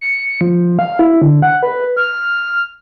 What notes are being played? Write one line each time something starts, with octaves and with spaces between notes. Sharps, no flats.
C#7
F3
F5
E4
D3
F#5
B4
F6